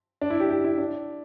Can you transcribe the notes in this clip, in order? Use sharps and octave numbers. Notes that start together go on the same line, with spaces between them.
D4
E4
G4
G4
E4
D4